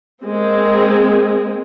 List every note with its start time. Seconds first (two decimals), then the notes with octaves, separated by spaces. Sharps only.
0.23 G#3 A#3 C4